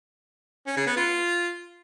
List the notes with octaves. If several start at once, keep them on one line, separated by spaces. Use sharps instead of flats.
C#4
C#3
B3
F4